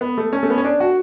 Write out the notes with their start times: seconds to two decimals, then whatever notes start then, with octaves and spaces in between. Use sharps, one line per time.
0.01 B3
0.18 A3
0.33 C#4
0.43 A3
0.50 B3
0.58 C#4
0.64 D4
0.80 F#4